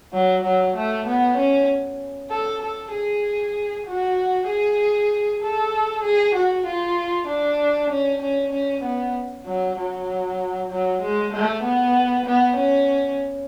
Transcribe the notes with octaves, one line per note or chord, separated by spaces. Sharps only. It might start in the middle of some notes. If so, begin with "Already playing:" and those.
F#3
F#3
A3
B3
C#4
A4
A4
G#4
F#4
G#4
A4
G#4
F#4
F4
D4
C#4
C#4
C#4
B3
F#3
F#3
F#3
G#3
A3
B3
B3
C#4